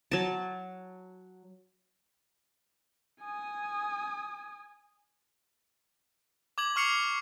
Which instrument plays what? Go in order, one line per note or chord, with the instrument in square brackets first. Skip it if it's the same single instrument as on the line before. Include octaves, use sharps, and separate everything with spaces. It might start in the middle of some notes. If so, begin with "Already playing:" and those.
[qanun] F#3 A5
[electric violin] G#5 D#6
[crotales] D6 G#6 F#7
C#6 F6 C7 C#7 F7